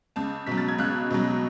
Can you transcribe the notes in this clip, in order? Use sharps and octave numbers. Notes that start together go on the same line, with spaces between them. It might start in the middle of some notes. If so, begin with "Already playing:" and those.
C#2 A5
B2 F#3 B6
A6
G#6
C#2 F#6
B2 F#3